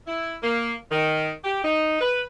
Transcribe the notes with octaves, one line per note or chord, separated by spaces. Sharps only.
E4
A#3
D#3
G4
D#4
B4